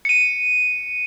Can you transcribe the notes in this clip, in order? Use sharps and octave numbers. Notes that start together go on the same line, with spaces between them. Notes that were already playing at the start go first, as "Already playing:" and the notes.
C#7 D#7